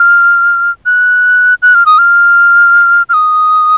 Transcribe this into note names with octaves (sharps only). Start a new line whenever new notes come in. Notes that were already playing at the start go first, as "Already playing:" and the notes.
Already playing: F6
F#6
F#6
F6
D#6
F6
F6
D#6